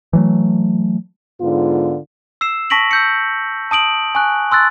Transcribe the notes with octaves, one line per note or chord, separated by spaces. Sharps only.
E3 F#3 A3
G#2 D3 B3 F4
E6 C7 E7
A5 C#6 A#6 B6 D7 F#7
E6 G6 C#7
A5 D#6 D7 F#7
G#5 C#6 F#6
C6 E6 F#6 A6